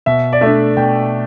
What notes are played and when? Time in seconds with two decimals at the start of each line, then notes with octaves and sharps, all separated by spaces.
0.06 B2 E5
0.32 D5
0.41 A3 D4 E5
0.77 B2 G5